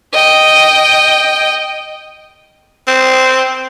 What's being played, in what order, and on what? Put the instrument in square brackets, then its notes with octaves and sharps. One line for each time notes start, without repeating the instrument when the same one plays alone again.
[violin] D#5 G5
[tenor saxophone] C4